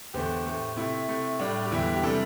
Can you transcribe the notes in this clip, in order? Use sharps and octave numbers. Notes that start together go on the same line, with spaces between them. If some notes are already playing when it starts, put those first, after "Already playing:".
E2 D3 A3 G4 C5
A2 A3
C3 A3 E4
C3 A3
A2 G3 D4
G4
E2 D3 G3 E4
G4
C3 G3 E4 A4